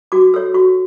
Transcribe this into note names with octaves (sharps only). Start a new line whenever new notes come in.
F#4 D6
A4 C#5 E6
F#4 C#6